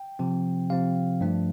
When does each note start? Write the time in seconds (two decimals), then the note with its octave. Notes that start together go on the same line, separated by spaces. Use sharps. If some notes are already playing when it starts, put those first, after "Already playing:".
Already playing: G5
0.19 C3 F3 C4
0.70 C3 F3 C4 F5
1.21 G2 F3 A3 D4